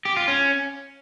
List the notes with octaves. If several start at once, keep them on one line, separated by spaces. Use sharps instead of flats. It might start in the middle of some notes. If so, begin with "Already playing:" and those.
G4
F4
C#4